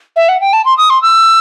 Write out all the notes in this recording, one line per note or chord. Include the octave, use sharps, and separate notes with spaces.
E5
F#5
G5
A5
C6
D#6
C6
E6